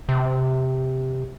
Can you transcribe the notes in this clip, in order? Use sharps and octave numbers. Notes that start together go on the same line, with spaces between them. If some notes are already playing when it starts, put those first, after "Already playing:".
C3